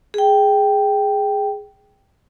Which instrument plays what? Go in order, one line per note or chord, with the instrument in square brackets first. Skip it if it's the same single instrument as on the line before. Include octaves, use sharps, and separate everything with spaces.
[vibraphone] G#4 G5